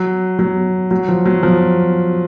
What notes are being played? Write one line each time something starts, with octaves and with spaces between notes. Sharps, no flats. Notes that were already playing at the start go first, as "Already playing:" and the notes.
Already playing: F#3
F#3
F#3
F3
F#3
F3